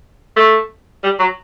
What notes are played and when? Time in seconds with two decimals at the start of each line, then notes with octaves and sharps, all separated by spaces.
0.36 A3
1.03 G3
1.19 F#3